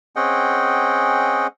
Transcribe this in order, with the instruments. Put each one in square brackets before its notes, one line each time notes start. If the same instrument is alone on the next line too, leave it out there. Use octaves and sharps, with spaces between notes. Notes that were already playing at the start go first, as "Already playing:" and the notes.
[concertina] C4 C#4 G#4 D#5 F#5 G5